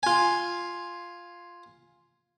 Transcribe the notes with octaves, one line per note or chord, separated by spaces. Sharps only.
F4 G#5